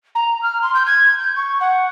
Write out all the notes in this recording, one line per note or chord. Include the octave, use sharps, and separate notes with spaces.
A#5
F6
C6
G6
G#6
G6
C#6
F#5